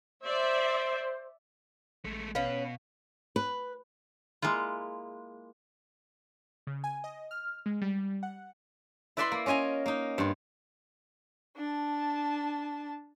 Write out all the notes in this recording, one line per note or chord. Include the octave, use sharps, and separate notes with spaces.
C5 D5 E5
A1 G#3 A3
B2 C#4 B4 F5
B4
G#3 A#3 E4 F4
C#3
G#5
D#5
F6
G#3
G3
F#5
E4 B4 D5 E5 B5 C6
A#3
C#4 F4 D#5 G#5 A#5
A#3 D#4
G2 F4
D4 A5